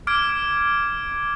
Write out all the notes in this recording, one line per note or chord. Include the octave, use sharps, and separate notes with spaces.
D6 F6 G#6 D7